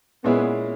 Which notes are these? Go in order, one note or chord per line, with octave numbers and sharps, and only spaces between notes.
A#2 G#3 B3 C#4 E4 G#4